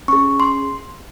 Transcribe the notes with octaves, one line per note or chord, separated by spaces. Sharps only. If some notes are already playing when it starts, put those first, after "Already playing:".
C#4 G#4 C#6
C6